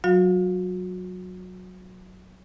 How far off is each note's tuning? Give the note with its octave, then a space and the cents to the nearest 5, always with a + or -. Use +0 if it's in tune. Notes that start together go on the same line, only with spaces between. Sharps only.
F#3 +0 F#4 -35 F5 +0